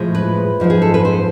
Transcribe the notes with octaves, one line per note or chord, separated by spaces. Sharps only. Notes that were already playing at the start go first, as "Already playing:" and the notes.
Already playing: A2 F3 G#3
B4
G#2 F3 G#3
G#4
A4
B4
C5